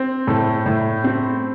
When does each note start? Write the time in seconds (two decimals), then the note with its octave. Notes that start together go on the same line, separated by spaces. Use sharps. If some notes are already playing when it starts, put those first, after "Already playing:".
Already playing: C4
0.27 A2 A4
0.66 A2
1.04 C4